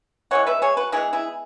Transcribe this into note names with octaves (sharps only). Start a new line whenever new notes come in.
E3 G#3 B3 C#5 F#5
B4 E5
G#4 C#5
F#4 B4
E3 G#3 B3 E4 G#4
E4 G#4